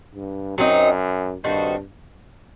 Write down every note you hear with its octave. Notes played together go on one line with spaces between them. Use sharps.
G2
F#2 F#3 C4 D#4
G2 D#3 A3 C4 F#4